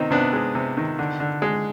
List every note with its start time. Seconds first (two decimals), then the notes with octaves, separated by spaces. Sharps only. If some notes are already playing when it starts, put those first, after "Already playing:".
Already playing: C3 D#3 B3 C4 D#4
0.11 C3 B3 D4
0.33 G#3
0.55 C3
0.77 D#3
0.99 D3
1.20 D3
1.42 G#3